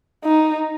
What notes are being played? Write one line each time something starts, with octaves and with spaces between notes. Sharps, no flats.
D#4